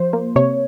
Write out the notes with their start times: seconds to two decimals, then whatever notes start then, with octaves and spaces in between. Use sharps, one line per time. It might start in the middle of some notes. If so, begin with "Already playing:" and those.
Already playing: F3 C5
0.13 A#3
0.36 C3 C#5